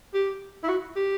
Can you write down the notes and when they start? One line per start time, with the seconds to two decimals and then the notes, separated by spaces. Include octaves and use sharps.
0.14 G4
0.63 E4
0.68 F#4
0.96 G4